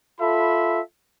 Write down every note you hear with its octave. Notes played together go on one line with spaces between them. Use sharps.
F4 A4 E5 B5